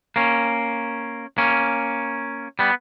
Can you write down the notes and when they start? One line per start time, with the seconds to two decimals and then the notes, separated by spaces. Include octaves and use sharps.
0.16 A#3 C#4
1.38 A#3 C#4
2.59 G3 B3